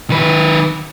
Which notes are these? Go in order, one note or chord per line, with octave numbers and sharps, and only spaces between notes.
D#3 B4